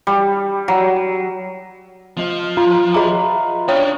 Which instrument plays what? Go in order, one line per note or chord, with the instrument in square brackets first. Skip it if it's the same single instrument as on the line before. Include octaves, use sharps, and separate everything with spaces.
[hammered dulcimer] G3
F#3
[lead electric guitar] F3 [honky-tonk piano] C4 D#5
[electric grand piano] F4 [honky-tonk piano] A#5
[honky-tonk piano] F#4 B4 E5 [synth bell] D#5 A#5
[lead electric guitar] C#4 D4 [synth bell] C#5 G5 D#6